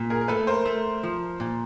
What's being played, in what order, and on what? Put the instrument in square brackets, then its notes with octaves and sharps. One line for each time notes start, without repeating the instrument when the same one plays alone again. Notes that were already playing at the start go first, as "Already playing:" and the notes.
Already playing: [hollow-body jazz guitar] A#2
[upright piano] G#4 A#4
A#4
[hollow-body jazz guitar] A3 [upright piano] A4 B4
[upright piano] A#4 C5
[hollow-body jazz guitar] A3
F3
A#2